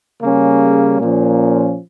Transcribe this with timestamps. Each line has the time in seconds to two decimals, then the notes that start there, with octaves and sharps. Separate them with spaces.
0.21 C#3 G3 A#3 C#4 G#4
1.00 A#2 F3 A#3 C#4